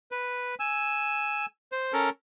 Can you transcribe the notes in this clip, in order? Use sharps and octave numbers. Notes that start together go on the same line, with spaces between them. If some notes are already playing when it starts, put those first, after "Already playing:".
B4
G#5 E6
C5
C#4 A4 A#4